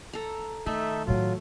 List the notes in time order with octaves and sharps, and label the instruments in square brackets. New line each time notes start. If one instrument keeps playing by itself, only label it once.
[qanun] A4 A#5
[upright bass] D#3 [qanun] A3 [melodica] D#4 A4 E5
[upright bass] A2 D#3 [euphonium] F#3 [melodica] F4